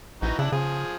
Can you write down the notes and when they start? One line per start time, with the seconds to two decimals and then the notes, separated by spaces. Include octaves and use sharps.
0.22 A#1 E3 D#4 F#4
0.39 C#3 D4 E4 F#5
0.52 C#3 F3 G#4